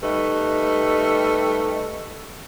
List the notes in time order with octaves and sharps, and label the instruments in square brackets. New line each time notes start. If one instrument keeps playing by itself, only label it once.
[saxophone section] G3 A3 D#4 B4